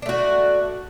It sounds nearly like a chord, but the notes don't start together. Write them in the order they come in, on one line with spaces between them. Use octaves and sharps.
D4 A3 F#4